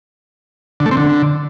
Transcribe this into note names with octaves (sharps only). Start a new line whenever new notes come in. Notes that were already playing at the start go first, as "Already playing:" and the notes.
D3
A3
C4
D3